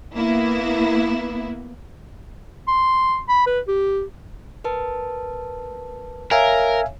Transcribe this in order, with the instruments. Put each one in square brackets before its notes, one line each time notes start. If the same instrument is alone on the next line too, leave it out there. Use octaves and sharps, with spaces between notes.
[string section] A#3 B3 E4
[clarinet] C6
B5
B4
G4
[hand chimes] A#4 B4 A5
[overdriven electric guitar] A#4 [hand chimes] C#5 [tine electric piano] E5 F5 G#5